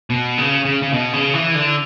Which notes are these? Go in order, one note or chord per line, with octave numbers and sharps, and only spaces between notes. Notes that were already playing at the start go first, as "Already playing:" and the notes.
B2
C#3
C#3
C#3
B2
C#3
E3
D3